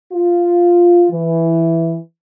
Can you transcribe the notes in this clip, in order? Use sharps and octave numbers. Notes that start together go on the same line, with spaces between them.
F4
E3